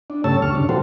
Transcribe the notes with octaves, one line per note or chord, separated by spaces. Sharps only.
D4
G2 C#3 A3 C#5 A5 E6
D2 G2 C#6 F6
C#3 D4
A#2 F3 G3 F#4 A4 C5